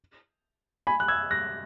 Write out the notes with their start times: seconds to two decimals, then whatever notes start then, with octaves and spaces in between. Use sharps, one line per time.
0.87 G#5 B5
1.00 F#6
1.08 E6 G#6
1.31 F#6 A#6